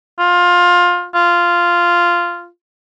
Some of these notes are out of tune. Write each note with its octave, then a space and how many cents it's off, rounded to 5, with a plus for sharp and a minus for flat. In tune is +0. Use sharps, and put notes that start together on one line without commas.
F4 +20
F4 -10